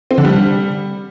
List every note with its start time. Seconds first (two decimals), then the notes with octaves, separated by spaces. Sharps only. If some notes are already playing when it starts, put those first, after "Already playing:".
0.11 C4
0.18 D3
0.25 G3